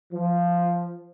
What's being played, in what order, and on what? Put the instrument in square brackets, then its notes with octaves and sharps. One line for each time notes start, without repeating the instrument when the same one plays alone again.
[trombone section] F3